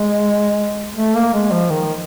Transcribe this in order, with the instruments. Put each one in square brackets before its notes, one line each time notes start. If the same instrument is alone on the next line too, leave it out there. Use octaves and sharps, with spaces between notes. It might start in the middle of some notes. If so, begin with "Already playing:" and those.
Already playing: [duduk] G#3
A3
A#3
G#3
F3
D#3